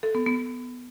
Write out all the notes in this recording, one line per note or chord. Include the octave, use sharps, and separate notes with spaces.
A4
B3
B3